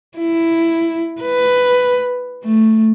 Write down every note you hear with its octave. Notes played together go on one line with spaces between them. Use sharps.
E4
B4
A3